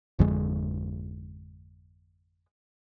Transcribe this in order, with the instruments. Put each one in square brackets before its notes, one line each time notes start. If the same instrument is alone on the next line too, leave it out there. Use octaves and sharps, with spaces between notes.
[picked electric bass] G#1 F2 D3 G#3